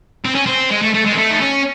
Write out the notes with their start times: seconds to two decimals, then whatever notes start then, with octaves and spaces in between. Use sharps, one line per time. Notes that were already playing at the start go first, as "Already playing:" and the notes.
0.25 C4
0.35 C#4
0.46 C4
0.70 G#3
0.82 A3
0.94 A3
1.05 G#3
1.12 C4
1.17 A3
1.31 D#4
1.40 C#4